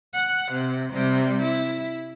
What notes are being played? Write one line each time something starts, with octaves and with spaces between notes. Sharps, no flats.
F#5
C3
C3 G3
E4